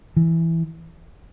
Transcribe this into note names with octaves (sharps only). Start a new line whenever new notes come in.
E3